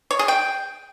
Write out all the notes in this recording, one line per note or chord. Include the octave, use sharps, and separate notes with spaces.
C#5
G#4
G5